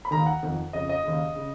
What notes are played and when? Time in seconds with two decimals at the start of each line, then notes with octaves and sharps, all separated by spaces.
0.05 B5
0.11 D#2 D#3 A#5
0.26 F#5
0.43 F2 D#3
0.73 F2 C#3 D#5
0.89 D#5
1.04 D#2 C#3
1.36 C#3